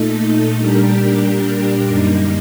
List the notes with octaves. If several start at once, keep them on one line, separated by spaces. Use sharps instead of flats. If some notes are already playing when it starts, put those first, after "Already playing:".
Already playing: A#2 A3 D#4 A4
A#2 G3 D4 G4 A#4
F#2 D3 G3 A#3 D#4